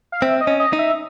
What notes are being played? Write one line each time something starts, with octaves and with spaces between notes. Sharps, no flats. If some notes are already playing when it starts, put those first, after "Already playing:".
F5
C4 E5
D#5
C#4
D#5
D#4
E5